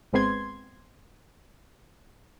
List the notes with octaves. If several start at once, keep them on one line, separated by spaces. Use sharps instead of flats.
G#1 G#3 B3 C4 C6 G#6